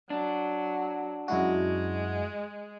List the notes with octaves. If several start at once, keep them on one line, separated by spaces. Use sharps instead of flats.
F#3 D4
F#2 G#3 E4 F#4